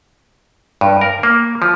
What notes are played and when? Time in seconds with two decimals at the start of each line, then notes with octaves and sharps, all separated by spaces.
0.81 G2
1.01 A#4
1.23 A#3
1.62 F3